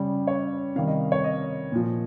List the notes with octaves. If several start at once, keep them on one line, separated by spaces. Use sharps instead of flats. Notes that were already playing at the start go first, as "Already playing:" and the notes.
Already playing: C#3 G3
C#5
C3 D#3 G3 F5
D#5
C#5
D#5
A#2 F3